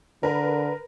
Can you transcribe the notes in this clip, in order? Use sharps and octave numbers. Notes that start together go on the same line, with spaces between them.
D3 A#4 B4